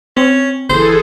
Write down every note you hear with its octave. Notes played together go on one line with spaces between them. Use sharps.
C4 C#4
G1 E3 G#4 A4 C5